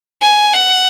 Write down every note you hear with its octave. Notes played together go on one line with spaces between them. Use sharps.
G#5
F#5